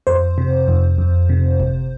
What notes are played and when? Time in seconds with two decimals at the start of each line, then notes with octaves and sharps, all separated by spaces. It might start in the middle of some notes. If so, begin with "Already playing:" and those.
0.07 F2 C5
0.38 C3
0.68 F2
0.98 F2
1.29 C3
1.60 G1